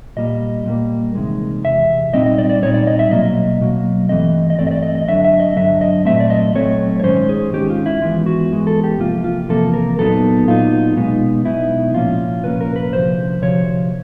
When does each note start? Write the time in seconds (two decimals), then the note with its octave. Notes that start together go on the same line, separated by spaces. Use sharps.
0.17 A#2 G3 A#3 D#5
0.66 A#2 G3 A#3
1.15 E2 C3 D#3 G#3
1.64 E2 C3 E5
2.13 A#2 G3 C4 D#4 D#5
2.26 D#5
2.38 D5
2.45 D#5
2.49 D5
2.62 A#2 G3 C4 D#4 C#5
2.74 D5
2.87 D#5
2.99 E5
3.11 B2 F#3 A#3 D#5
3.61 B2 F#3 A#3
4.09 G2 E3 A3 C4 D#5
4.50 D#5
4.58 G2 E3 A3 C4 D5
4.67 D#5
4.71 D5
4.83 D#5
4.95 D#5
5.07 G2 D3 F#3 E5
5.24 E5
5.40 D#5
5.56 G2 D3 F#3 E5
5.81 D#5
6.05 A#2 F#3 A3 C4 E5
6.20 D5
6.30 D#5
6.54 A#2 F#3 A3 C4 C#5
7.00 C#5
7.04 G#2 D#3 G#3 C#4 C5
7.29 G#4
7.52 G#2 D#3 G#3 C#4 G4
7.70 F4
7.86 E4
8.02 G#2 E3 G#3 B3 F4
8.26 F#4
8.52 G#2 E3 G#3 B3
8.67 A4
8.84 G4
8.99 E2 C3 F3 A#3 F4
9.24 F4
9.49 E2 C3 F3 A#3 A4
9.74 A#4
9.98 A#2 F#3 B3 D#4 A4
10.48 A#2 F#3 B3 D#4 F4
10.96 B1 B2 G#3 B3 D#4
11.45 B1 B2 G#3 B3 D#4 E4
11.94 C2 A#2 F3 A#3 C#4 F4
12.44 C2 A#2 F3 A#3 C#4 B4
12.61 A#4
12.76 B4
12.93 D2 C3 F3 C5
13.41 D2 C3 F3 C#5